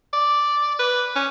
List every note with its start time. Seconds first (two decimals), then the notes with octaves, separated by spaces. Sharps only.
0.13 D5
0.79 B4
1.16 C#4